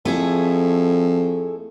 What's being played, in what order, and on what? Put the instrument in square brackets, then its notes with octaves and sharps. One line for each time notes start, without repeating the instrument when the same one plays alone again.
[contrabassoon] F2 [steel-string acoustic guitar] A3 E4 G#4